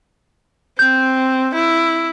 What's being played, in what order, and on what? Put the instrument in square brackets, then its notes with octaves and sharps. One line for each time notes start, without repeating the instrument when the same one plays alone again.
[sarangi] C4 [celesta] G6
[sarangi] E4